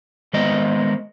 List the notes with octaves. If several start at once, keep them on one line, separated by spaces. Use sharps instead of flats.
D#3 G#3 B3 C5 D#5